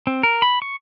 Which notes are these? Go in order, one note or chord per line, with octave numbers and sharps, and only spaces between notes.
C4
A#4
B5
C#6